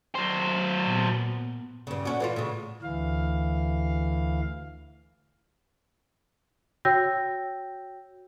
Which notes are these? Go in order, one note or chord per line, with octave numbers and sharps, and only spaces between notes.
F#3 C5
A#2 B3
G2 C#3
D3 C#4 F#4
E3 A3 F4
A2 C#3
D2 E3 F5
F#4 C#5 G5 E6 G6 A#6